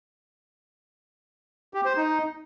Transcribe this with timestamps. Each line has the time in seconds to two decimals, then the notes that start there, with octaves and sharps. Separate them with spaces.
1.74 G4
1.85 C5
1.96 D#4